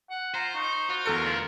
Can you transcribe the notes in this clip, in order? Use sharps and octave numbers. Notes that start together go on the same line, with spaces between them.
F#5
F4 C5 A#5
D#4 C#6
F4 F#4
E2 A4 A#4 C#7
D2 D3 F4